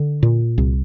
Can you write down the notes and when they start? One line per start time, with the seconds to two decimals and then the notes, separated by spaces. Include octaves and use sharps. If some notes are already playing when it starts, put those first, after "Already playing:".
Already playing: D3
0.23 A#2
0.58 C2